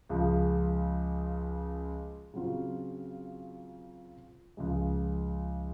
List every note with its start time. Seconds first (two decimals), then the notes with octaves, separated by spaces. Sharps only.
0.09 C#2 C#3 F3
2.34 C#3 F#3 C4 F4
4.57 C#2 C#3 F3 G#3